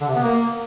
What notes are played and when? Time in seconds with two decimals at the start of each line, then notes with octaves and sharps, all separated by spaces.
0.01 D3
0.08 C3
0.15 B3
0.23 A#3